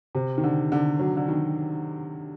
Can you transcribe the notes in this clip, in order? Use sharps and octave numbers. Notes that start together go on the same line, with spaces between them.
C3
D#3
D3
D3
F#3
D3
D#3